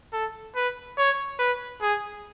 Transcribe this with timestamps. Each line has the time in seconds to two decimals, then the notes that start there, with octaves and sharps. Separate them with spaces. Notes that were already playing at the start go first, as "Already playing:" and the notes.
0.13 A4
0.56 B4
0.98 C#5
1.39 B4
1.82 G#4